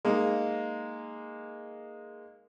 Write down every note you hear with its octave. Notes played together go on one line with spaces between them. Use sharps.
G#3 A#3 D#4